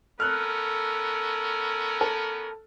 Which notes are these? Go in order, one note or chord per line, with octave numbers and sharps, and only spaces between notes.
B3 C#4 A4 A#4 F6 F#6
A4